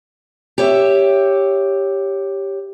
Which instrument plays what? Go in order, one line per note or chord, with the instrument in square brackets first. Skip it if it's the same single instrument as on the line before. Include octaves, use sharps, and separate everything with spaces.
[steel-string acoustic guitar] G4 C#5 E5